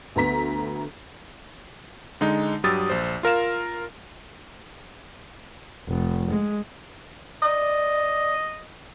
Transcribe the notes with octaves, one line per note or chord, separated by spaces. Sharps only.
D2 B3 A#5 B6
D3 G#3 D#4
G2 F#3 G4 D#6 E6 A6
A#1 C5
F4 A#4 F5 E7
F1
G#3
D5 D#5